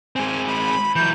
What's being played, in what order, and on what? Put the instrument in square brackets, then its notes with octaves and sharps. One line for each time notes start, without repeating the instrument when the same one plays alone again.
[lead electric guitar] G#3 C4 [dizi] G#5
[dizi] B5
[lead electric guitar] E3 F#3 [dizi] G6